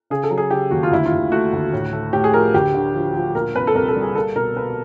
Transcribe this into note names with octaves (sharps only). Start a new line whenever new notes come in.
C#3 G#4
A4
F#3
G#4
C#3 G4
D#2 F#4
F4
D2 E4
F4
D2
A3 F#4
D2
A2
A3
A2 G4
G#4
F3 A#4
D2 G4
D3
F3
F3
A#2 A#4
C2 B4
A4
C2 A#4
A4
G3
G#4
A#3 A4
B2 A#4
A#3 B4